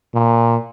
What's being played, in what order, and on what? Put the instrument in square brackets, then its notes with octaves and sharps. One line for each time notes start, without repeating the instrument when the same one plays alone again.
[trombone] A#2